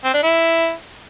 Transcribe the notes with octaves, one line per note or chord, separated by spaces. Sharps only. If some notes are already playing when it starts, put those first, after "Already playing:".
C4
D4
E4